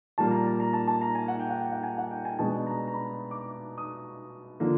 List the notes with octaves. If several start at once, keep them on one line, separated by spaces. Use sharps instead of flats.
A#2 G3 A#3 A5
A#5
A5
A#5
A5
A5
A#5
G#5
F#5
G5
F#5
G5
F#5
G#5
F#5
G5
G#5
B2 G#3 B3 D4 A5
A#5
A#5
B5
D6
D#6
D3 F3 A#3